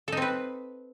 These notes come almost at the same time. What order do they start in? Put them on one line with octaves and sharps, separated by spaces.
A4 D#4 C4 B4